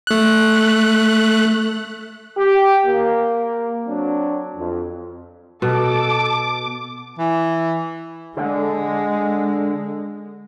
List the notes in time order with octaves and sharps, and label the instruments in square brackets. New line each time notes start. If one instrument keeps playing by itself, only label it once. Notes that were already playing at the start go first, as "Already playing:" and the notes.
[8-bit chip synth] A3 F#6
[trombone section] G4
A#3
F#3 C4 D4
F2
[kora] B2 [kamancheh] A4 [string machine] D6
[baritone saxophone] E3
[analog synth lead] D3 [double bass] G#3